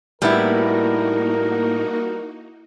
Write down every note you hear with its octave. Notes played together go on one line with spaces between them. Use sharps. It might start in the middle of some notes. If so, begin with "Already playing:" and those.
A2 G3 A#3 B3 D#4 E4 F#4 A#4